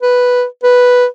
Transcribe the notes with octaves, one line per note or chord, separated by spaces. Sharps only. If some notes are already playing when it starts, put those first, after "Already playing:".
B4
B4